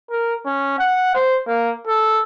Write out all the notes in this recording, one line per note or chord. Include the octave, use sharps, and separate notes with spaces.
A#4
C#4
F#5
C5
A#3
A4